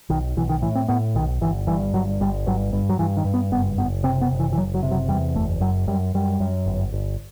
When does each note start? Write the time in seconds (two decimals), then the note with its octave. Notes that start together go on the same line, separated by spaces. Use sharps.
0.10 B1 D#3
0.37 B1 E3
0.49 D#3
0.62 A2 E3
0.75 C4
0.88 A2 B3
1.15 B1 D#3
1.41 G1 E3
1.67 G2 E3
1.93 G1 F#3
2.21 G1 G3
2.47 G2 F#3
2.73 G2
2.89 F#3
2.99 G2 E3
3.17 D#3
3.25 G2
3.34 B3
3.52 F#1 B3
3.78 F#1 B3
4.03 C3 C4
4.21 B3
4.31 F#1
4.40 E3
4.53 E3
4.57 F#1 F#3
4.74 F#3
4.83 C3
4.91 F#3
5.09 E2 G3
5.35 F#1 A3
5.61 F#2 F#3
5.87 F#2 G3
6.14 F#2 G3
6.40 F#2
6.66 G1
6.92 G1